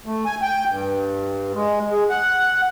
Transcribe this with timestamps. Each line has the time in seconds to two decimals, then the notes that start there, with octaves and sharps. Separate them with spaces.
0.06 A3
0.25 G#5
0.42 G5
0.69 G2
1.54 G#3
1.89 G#3
2.09 F#5